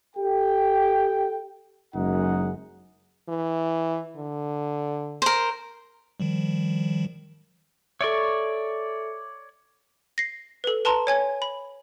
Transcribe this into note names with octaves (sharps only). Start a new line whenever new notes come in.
G4 A4 G5
F#1 F#2 G#3 D#4 F#5
E3
D3
A#4 C5
D#3 F3 G3
A4 C#5 D5 E5 C#6
A#6 C7
A4 B4
B4 A5 A#5 C6
C#5 G#5 G#6
B5